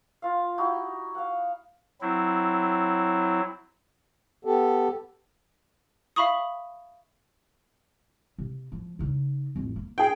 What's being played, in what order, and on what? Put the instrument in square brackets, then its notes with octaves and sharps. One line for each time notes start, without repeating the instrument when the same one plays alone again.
[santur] F4 F5
D#4 E4 F#4 G4
F5 F#5
[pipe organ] F#3 C4 E4
[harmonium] B3 G4 A4
[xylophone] E5 F5 B5 C#6 D#6
[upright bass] C3
F3
C#3 D#4
A1 F2
A#3
[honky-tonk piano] G#4 G5